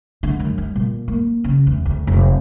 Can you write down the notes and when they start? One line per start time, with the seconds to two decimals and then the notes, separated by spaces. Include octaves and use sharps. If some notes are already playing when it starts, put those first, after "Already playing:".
0.23 D3
0.40 F#2
0.58 G3
0.76 A#2
1.08 A#3
1.44 C#3
1.67 E2
1.85 D2
2.07 F1